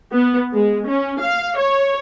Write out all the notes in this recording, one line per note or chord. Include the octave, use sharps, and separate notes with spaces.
B3
G#3
C#4
F5
C#5